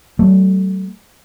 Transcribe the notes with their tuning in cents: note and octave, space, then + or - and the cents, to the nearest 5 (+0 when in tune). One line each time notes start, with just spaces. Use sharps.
F#3 +40 A3 +5